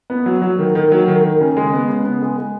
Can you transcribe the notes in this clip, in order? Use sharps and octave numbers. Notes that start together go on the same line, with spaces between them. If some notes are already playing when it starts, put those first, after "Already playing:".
B3
F#3
F#3
D#3
D#3
F#3
D#3
D#3
C#3
G#3
B3
C#3
B3
G#3
G#3